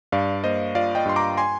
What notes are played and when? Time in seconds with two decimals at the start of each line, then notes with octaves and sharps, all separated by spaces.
0.12 G2 D5 F5
0.44 A#3 C5 D#5
0.75 F4 D5 F5
0.95 D#5 G5
1.05 G2 C6
1.16 A#5 D6
1.37 G#5 C6